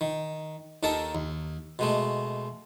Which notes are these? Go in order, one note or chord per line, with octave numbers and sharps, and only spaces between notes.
D#3
D#2 D#3 A4 A#4 A5
D#2
B2 G#3 A3